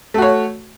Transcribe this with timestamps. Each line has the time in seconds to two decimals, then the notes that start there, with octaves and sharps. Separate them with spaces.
0.14 A3
0.18 F#4
0.22 C#5